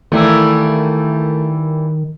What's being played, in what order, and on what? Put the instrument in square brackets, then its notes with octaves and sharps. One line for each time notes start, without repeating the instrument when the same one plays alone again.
[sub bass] D#3 [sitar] E3 G3 A#3 [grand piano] A3